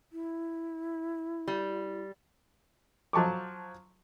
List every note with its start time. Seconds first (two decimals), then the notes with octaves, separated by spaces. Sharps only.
0.12 E4
1.48 G3
3.13 F3 F#3 A5 C#6 D6